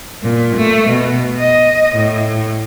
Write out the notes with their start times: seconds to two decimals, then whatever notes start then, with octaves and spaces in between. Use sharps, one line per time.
0.23 A#2
0.56 A3
0.89 B2
1.40 D#5
1.95 A2